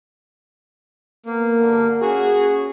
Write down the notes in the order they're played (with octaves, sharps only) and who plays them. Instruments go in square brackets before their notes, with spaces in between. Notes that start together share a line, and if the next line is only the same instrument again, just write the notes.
[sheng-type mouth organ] A#3 [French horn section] B3 A#4
[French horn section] G2 D3
[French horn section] C#4 G#4 [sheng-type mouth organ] F#4